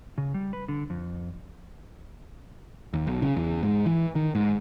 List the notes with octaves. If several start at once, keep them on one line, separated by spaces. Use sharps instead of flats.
C#3
G3
B4
D3
F2
D#2
B1
C#3
E2
G#2
E3
D#3
G#2